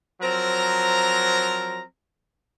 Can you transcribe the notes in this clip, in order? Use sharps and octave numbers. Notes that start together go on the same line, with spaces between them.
F3 F#3 C4 A#4 A#5